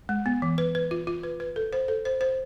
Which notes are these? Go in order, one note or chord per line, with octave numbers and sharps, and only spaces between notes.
G#3
B3
E3
B4
B4
F4
F4
B4
B4
A4
C5
A4
C5
C5